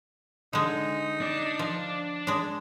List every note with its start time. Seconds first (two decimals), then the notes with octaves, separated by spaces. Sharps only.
0.53 D3 G#3 D#4
1.21 D4 D5
1.59 F3
2.27 G#3 D4